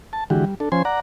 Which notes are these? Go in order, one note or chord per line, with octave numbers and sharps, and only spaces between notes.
A5
D3 E3 G#3 F#4 G4
G3
D4 A4
F3 C#4 C5 G#5 C6
D5 F#5 A#5